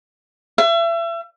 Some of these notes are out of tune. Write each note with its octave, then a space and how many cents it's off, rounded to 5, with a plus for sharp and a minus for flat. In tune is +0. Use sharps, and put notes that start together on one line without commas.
E5 +35